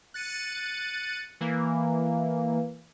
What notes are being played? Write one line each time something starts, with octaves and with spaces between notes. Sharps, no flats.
F#6 A6 C#7 D#7
E3 A#3